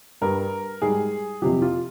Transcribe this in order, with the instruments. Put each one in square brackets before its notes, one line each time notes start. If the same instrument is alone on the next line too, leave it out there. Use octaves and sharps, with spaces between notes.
[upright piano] G2 G3 A#4
G#2 G3 G#4
F2 C3 F3 G4
F4